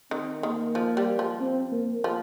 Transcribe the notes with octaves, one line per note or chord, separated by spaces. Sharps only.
D#3 C4
D#3 A#3
F3
G3
F3
C4
A#3
F3